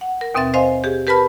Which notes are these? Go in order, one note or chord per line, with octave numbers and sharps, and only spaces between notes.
F#5
A#4
D#2 B2 C4 E5 A6
C5 D#5 F5 G#5 C6
G4 G#4
G4 A#4 B4 A5 B5 F6